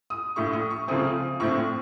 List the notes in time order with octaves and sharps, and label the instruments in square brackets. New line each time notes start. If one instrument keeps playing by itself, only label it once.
[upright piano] D#6
A#1 A2 A3 C#6
D#6
C#6
C#2 C#3 F3 A3 C4 D#6
A#1 A2 A3 C4 C#6